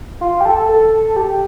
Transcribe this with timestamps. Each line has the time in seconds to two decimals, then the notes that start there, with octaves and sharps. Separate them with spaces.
0.21 F4
0.40 G4
0.45 A4
0.69 A4
1.16 G4